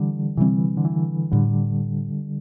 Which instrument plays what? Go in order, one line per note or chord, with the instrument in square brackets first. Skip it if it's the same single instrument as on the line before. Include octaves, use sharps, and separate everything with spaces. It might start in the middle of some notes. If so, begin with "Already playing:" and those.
Already playing: [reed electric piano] D3 E3 G3
[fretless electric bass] C3 G3 C4 [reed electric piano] E3
[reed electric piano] D3
E3
[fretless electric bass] A2 [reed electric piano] D3 G3